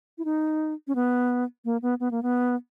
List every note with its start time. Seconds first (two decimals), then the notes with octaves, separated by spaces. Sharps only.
0.18 E4
0.25 D#4
0.87 C#4
0.95 B3
1.65 A#3
1.82 B3
2.00 B3
2.11 A#3
2.23 B3